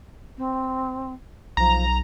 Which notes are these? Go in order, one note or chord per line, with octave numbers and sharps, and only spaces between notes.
C4
B1 F3 A#5